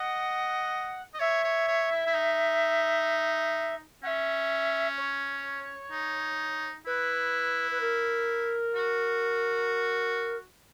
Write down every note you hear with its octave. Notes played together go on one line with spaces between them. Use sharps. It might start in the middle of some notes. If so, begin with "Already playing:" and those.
Already playing: D#5 F#5
D#5
C#5 E5
C#5
C#5
E4
E4
D#4
C#4 E5 F#5
C#5
D#4
E4 B4
B4
A#4
F#4